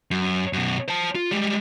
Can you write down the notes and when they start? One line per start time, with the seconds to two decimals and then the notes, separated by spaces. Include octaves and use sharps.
0.11 F#2
0.53 F#2 B2
0.88 C5 A5
1.15 F4
1.31 G3 G#3